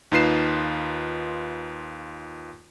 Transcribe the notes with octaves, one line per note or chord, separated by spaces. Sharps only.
D#2 D#4 F4 B4 C7 E7